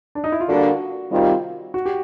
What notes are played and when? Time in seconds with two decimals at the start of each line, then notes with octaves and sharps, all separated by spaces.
0.15 D4
0.24 D#4
0.32 E4
0.40 F4
0.49 D3 G3 A#3 D4 F#4
1.12 C3 D#3 G3 C4 F4
1.74 F#4
1.86 G4